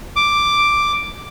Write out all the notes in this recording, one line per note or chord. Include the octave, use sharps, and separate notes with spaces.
D6